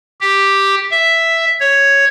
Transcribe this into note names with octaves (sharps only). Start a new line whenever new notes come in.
G4
E5
C#5